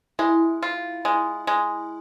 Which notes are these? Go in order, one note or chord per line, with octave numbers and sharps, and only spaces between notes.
G#3 E4
F4
G#3
G#3